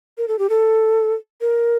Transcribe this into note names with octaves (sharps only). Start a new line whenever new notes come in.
A#4
A4
G4
A4
A#4